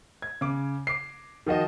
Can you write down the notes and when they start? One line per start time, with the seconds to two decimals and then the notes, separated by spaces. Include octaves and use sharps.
0.22 G#6
0.41 C#3 D6
0.87 D6 C7
1.46 D#3 F3 F#4 D#5